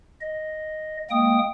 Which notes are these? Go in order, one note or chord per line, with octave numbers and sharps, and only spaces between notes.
D#5
G#3 A#3 G5 D#6